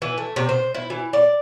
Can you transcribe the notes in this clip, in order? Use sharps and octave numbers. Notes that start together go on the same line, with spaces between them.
E3
A3
C3
C5
E4
E3
D5